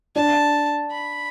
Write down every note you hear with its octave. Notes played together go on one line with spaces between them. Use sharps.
D4 A5
B5